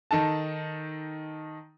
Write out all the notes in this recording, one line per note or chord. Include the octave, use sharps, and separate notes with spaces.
D#3 D#4 A4 A5